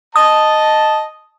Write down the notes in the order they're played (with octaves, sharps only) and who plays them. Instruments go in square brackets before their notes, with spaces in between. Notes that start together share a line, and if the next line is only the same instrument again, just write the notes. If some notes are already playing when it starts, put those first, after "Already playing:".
[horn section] D#5 A5 [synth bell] D#6